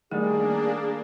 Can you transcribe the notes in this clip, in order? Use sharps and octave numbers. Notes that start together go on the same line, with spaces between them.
D#3 G3 A3 A#3 D4 G#4